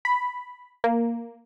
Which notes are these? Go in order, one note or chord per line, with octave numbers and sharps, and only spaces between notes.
B5
A#3